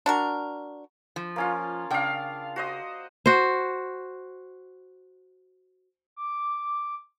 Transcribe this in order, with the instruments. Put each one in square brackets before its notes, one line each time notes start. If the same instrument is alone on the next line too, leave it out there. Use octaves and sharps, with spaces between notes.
[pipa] D4 F#4 A#4
[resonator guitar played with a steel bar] F3
[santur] A#3 C#4 F4
[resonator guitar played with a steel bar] C#3 G5 [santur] D4 F5
[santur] F#4 C5 D#5
[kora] F#4 C5
[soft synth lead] D6